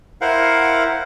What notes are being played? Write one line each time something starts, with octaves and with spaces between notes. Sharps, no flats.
E4 A#4 C5 F5 F#5